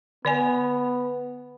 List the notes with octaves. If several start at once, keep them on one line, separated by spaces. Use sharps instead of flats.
D3 B3 D5 G#5